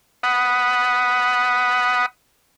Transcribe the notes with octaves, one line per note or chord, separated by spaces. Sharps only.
F#5 B5 D#6